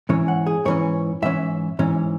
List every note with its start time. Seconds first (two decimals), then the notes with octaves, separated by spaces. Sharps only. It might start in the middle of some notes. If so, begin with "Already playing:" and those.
0.09 G#2 E3 C#4 C#5
0.28 F#5
0.47 G#4
0.65 G#2 E3 C#4 C#5
1.22 G#2 E3 C#4 E5
1.79 G#2 E3 C#4